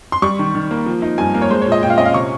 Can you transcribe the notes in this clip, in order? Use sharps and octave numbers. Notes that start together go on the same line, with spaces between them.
C6
G3 C#6
D#3
D#3
A#3
F3
D#4
G2 G#5
A#3
C#5
G#3 C5
A#2 C#5
D#5
A#2 G5
F5
C#4 D#5
F5
C3 C#6